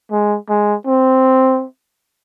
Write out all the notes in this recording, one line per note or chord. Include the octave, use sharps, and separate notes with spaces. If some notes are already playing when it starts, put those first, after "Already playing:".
G#3
G#3
C4